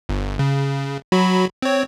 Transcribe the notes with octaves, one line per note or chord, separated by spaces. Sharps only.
G1
C#3
F#3 F#4 B5
C4 C#5